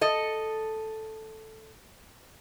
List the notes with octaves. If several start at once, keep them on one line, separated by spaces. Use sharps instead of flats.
A4 D#5